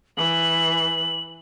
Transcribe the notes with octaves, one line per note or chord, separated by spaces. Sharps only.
E3 F#7